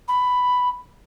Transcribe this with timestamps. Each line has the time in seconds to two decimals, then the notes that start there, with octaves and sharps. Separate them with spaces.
0.08 B5